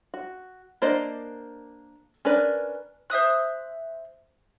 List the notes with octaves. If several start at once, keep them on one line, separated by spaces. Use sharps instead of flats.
F#4
A#3 D4 C5 D5 D#5
C#4 D4 A#4 B4 D5
C5 E5 D#6 F#6